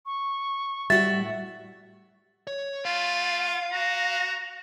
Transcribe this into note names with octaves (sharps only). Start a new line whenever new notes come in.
C#6
A2 G3 F#4 E5 A6
C#5
A3 F4 F5
F#4 A#5